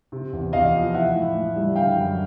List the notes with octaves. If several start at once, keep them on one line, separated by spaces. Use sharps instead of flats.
C3
E2
E2 D#5 F5
F3
E3 E5 F#5
A2
A2
G3
D3 F5 G5
F#2